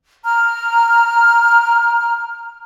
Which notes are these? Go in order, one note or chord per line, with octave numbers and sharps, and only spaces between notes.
A#5 F6